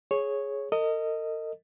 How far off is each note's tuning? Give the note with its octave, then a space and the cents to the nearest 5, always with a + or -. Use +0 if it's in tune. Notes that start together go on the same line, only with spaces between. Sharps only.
G#4 +5 C#5 -5
A#4 -45 D#5 +0